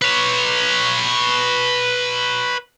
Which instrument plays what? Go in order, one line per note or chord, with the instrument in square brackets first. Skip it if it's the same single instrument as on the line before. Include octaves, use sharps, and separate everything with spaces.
[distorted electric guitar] B4 C#5